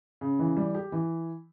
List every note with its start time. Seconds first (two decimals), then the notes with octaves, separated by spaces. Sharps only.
0.21 C#3
0.39 E3
0.57 G3
0.75 G4
0.92 E3